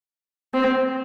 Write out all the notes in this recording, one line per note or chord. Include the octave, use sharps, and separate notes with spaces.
C4